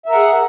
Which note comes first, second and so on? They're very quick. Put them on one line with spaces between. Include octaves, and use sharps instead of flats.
E5 A#4 F#5 G#4